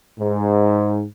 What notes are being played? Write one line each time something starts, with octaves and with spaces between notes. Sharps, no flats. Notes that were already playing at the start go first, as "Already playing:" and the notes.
G#2